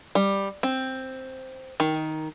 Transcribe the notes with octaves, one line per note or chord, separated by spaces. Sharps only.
G3
C4
D#3